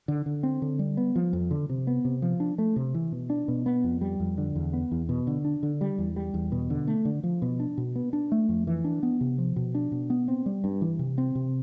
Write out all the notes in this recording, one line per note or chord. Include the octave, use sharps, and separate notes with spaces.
D3
D3
C4
D3
G3
B3
F3
F2
D3
C3
B3
C3
F3
D4
A3
C3
E3
B2
D4
B2
B3
F2
G3
F2
D3
E2
B3
E2
B2
D3
D4
D3
G3
E2
G3
E2
B2
D3
A3
D3
F3
B2
D4
B2
B3
D4
A3
F2
E3
D4
B3
C3
F3
B2
D4
B2
B3
C4
G3
G2
E3
C3
C4
C3